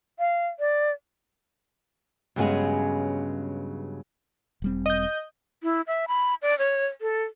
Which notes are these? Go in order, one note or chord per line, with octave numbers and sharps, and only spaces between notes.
F5
D5
G2 C#3 F#3 G#3 B3 G#4
E1 G3 C4
D#5 G6
E4
E5
B5
D5
C#5
A4